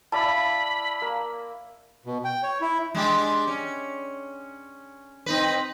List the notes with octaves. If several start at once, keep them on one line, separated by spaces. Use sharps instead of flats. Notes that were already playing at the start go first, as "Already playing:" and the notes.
E4 D5 F5 A5 B5
A#3
B2
G5
C#5
E4
G#3 D4 G4
C#4
C4 D#4 B4